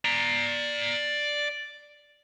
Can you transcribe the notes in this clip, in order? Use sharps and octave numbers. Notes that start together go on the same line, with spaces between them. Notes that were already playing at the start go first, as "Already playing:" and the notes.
D5 A#5